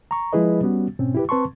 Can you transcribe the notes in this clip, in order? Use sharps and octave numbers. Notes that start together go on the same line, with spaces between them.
A#5 C#6
F3 G#3 E4 G#4 B4 D#5
G3 B3 C#4 F#4
G#2 B2 C4 C#4
E4 G4 B4
C4 B4 A5 C6 C#6